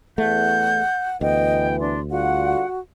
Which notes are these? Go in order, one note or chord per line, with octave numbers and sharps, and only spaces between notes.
E2 A3 F#5 G6
D2 E3 B3 D#5 G5
D4 C6
D3 G3 F4 F#4 F#5